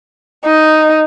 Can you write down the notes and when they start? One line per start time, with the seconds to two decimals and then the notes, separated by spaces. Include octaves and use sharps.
0.45 D#4